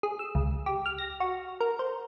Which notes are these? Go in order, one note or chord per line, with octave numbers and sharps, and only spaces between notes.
G#4
E6
C#2
G4
F6
A#6
F#4
A#4
C5